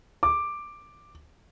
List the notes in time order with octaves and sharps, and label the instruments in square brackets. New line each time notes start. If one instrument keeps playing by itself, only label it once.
[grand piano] D6